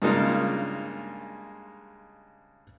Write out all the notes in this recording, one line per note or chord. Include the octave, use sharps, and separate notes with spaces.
G2 C#3 G#3 A#3 D#4 F4